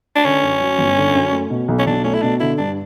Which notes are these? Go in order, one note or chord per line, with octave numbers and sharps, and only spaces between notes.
D4
D3 C#4
F#2
F#3
G1
D3
F#2
A3
B2
B1
C#4
B1 D4
A3 C#4
E4
B2 D4
D3 E4
G2 D4